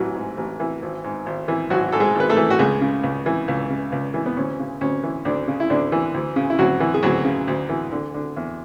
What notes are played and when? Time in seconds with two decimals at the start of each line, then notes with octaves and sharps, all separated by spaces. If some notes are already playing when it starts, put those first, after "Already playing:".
Already playing: A1 E3 F#3 F#4
0.15 G#2
0.37 A1
0.60 E3
0.82 G#1
1.04 G#2
1.26 G#1
1.48 E3
1.70 G#1 F#3 F#4
1.92 G#2 A4
2.00 G#3 G#4
2.15 G#1 B4
2.29 A3 A4
2.37 E3
2.50 F#4
2.59 C#2 G#3 G#4
2.81 C#3
3.03 C#2
3.26 E3
3.48 C#2
3.70 C#3
3.92 C#2
4.14 E3
4.26 B3
4.37 D2 C#4
4.59 C#3
4.81 D2 C#4
5.03 E3
5.25 D2 D3 D4
5.48 C#3
5.60 E4
5.70 D2 D3 D4
5.92 E3
6.14 D2
6.36 C#3
6.50 E4
6.58 D2 F#3 F#4
6.80 E3
6.94 G#4
7.03 D2 F#3 F#4
7.25 C#3
7.47 D2
7.69 E3
7.92 D3
8.14 D3
8.36 E2